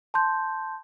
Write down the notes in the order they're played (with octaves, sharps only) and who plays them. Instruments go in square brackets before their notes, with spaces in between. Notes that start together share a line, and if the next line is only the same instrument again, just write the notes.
[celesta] A5 C6 G6